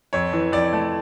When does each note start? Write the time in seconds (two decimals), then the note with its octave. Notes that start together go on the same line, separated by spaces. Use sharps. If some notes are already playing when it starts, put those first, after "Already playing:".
0.13 F2 C#5
0.33 E3
0.52 F2 D5
0.73 A3